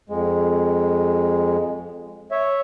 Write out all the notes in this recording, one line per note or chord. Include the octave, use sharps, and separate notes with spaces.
F2 G#3
C#5 E5